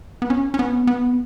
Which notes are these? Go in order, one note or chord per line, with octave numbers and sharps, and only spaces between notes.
B3
C#4
C#4
B3
B3